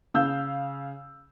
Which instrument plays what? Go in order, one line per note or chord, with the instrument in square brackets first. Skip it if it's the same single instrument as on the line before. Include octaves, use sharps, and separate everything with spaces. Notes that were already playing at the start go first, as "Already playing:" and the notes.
[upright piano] C#3 F5 E6 G6